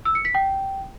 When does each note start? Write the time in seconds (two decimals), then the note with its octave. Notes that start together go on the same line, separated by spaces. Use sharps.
0.05 E6
0.15 C#7
0.25 B6
0.35 G5